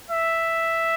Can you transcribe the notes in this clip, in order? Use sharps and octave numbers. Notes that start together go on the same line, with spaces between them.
E5